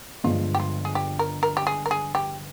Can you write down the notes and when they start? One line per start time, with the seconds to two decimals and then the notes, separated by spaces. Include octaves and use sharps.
0.24 G1 G2 F3 G#3 F4
0.55 G4
0.60 F4
0.85 G#4
0.95 G4
1.19 A#4
1.43 A#4
1.57 G4
1.67 G#4
1.86 A#4
1.91 G#4
2.15 G4